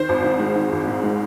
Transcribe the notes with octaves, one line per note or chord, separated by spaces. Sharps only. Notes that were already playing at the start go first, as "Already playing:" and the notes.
Already playing: D#3 C5
G#1
G#2
G#3
D#3
G#1
G#2
G#3